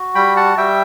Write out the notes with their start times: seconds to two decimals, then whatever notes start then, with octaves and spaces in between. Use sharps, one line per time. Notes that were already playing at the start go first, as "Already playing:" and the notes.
Already playing: F#4
0.15 G3 G5 B5
0.36 F#5 A5
0.57 G3 E5 G5